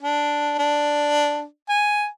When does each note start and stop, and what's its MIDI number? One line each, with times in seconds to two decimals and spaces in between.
0.01 0.54 62
0.59 1.45 62
1.69 2.07 80